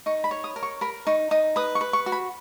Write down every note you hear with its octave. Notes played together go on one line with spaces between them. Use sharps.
D#4 C#6
B5
C#5
D#6
A#4
C#6
A#4 B5
D#4 C#6
D#4 D#6
B4 D#6
C#6
B4
C#6
F#4
B5